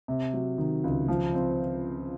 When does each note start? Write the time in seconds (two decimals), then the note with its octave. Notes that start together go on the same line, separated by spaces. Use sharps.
0.08 C3
0.33 F#3
0.58 D#3
0.84 C#2
1.08 F3
1.34 C4